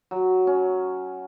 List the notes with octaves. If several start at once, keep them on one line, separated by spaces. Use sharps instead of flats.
F#3
C#4